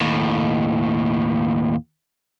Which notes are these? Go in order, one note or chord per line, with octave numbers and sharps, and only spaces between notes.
D#2 A2